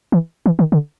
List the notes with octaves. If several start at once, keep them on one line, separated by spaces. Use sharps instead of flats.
E3
E3
D#3
D3